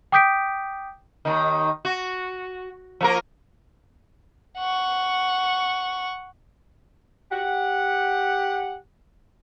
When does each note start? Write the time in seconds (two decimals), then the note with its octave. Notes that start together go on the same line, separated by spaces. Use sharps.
0.12 G5 D6 D#6 G6 B6 D7
1.25 D#2 D#3
1.85 F#4
3.01 F3 A#3 A#4
4.58 F#5 C#6
7.32 G4 F#5